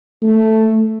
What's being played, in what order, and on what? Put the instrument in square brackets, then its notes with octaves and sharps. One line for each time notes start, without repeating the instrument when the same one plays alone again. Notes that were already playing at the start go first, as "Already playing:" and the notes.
[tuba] A3